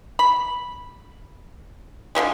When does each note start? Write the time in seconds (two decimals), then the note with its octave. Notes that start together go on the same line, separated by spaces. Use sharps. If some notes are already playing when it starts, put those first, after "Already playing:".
0.19 B5
2.15 D3 F3 G3 G#3